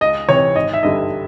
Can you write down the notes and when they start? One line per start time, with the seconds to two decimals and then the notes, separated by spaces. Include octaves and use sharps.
0.01 C#2 D#5
0.28 C3 E3 C#5
0.56 G#1 D#5
0.73 E5
0.83 G2 D3 G3 D#5